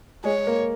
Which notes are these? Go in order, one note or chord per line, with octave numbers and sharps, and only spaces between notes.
G#3 G#4 C#5
A#3 A#4